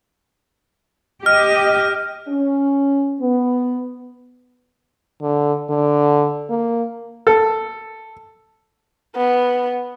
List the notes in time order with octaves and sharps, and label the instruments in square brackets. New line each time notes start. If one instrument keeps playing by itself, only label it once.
[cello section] G4 D#5 [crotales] F6
[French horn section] C#4
B3
[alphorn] D3
D3
A#3
[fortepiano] A4
[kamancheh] B3